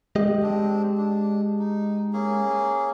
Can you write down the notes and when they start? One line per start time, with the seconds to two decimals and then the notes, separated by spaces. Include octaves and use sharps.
0.16 G#3 G4 D#5
0.43 C4 D4
0.98 D4
1.59 D#4
2.13 A#3 C#4 G#4